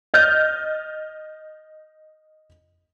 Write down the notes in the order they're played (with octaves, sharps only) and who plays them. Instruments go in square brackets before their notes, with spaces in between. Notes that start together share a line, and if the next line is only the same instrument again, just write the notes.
[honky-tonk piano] D#5 D#6 F6 G6 A6